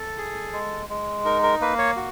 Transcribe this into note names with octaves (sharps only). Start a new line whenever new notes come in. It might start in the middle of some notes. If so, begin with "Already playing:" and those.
Already playing: A4
G#4
G#3
G#3
D#4 A#4
A#4
A#3 B4
C#5
F#4